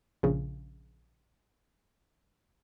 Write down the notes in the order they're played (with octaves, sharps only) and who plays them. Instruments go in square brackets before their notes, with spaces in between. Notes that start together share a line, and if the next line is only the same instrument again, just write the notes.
[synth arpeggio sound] A#1 C#3